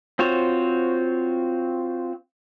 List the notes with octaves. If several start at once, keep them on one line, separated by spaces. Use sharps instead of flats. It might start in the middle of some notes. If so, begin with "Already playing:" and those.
C4 F4 F#4 C5 C#5